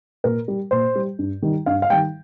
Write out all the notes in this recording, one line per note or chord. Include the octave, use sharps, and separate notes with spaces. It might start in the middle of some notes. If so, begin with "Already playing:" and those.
A#2 A#4
G3
A#2 C5
G3
G2
D#3 G3
G2 F5
F5
D#3 G3 G5